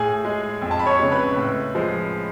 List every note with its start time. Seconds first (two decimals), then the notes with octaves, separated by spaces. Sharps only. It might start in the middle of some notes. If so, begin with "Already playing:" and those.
Already playing: A2 G#4 G#5
0.25 G#3
0.62 F2
0.71 A5
0.79 B5
0.86 C#5 C#6
0.99 C#3 G#3
1.12 B4 B5
1.37 A2
1.75 F3 G#3